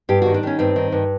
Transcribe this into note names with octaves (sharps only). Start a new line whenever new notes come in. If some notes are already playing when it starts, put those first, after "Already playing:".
G2 G4
F#4
D#3
D4
D#3 C#4
G2 C4
D#3
G2